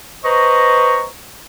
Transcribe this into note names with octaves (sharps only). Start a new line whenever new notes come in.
B4 C5 D#5 A#5 C#6